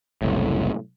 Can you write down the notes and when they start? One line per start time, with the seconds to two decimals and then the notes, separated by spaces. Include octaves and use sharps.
0.22 F#1 C2 A2